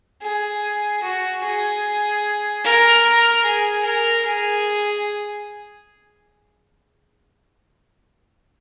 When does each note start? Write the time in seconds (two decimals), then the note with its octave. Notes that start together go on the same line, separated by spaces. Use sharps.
0.22 G#4
1.03 F#4
1.44 G#4
2.64 A#4
3.45 G#4
3.85 A#4
4.26 G#4